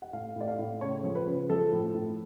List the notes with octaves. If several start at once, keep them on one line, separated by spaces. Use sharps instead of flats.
F#5
A2 F5
A2 D5
F5
A2
C#3 C#5
F3
B4
C#3
F3 A4
A2
A2